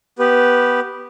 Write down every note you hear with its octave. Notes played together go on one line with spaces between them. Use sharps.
B3 G4 B4